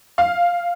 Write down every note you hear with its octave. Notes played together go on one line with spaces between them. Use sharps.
F5